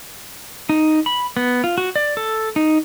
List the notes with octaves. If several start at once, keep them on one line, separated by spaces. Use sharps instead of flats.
D#4
B5
B3
F4
F#4
D5
A4
D#4